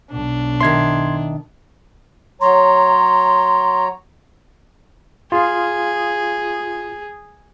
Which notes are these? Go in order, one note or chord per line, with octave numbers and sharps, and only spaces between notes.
B1 D4
D#3 E5 C6 G#6
F#3 C#5 A#5 C6
F4 G#4